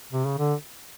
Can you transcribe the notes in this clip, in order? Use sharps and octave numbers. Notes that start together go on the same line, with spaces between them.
C3
C#3
D3